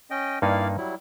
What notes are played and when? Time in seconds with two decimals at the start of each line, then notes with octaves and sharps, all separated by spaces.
0.10 C#4 D#5 G5
0.42 G2 A#3 D#4 E4 D5 F5
0.77 F#3 G3 E4